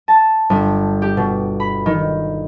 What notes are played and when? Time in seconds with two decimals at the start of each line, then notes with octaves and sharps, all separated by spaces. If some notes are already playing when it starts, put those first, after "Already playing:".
0.08 A5
0.50 G1
1.02 G4
1.17 B2
1.60 B5
1.86 D#3